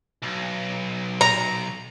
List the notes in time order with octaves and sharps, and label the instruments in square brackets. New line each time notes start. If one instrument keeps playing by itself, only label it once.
[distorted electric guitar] B1
[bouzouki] A#5